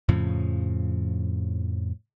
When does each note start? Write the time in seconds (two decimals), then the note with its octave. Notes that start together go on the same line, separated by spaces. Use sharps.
0.09 F2 A2 C#3 F3